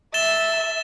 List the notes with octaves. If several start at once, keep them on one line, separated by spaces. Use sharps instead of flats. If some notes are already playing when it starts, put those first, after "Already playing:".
E5 A6 E7 G7